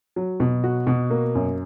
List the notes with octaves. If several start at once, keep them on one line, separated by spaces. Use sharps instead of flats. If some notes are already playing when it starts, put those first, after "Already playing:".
F#3
B2
F#4
B2
A#3
F#2